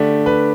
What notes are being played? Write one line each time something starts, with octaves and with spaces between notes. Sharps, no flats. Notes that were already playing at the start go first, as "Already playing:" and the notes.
Already playing: D3 A3 D4 G4
B4